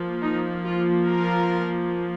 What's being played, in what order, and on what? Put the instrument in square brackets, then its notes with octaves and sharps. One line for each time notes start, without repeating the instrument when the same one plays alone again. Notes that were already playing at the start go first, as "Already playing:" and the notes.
Already playing: [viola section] F3 A#3
D#4
F4
F4 A#4